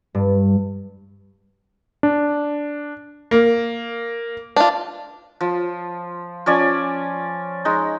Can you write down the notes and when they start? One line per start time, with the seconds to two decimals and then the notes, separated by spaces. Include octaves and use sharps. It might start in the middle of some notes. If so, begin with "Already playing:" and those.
0.15 G2
2.03 D4
3.31 A#3
4.56 D4 F4
5.41 F3
6.46 F3 C#4 D5 G#5
7.65 G#3 D#4